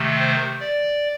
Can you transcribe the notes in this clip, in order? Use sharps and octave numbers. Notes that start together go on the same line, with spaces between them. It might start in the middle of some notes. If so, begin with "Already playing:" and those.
Already playing: C3 D#3 A3
C5
D5